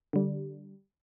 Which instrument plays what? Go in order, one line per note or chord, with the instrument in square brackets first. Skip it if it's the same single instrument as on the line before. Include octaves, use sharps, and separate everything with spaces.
[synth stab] D3 G3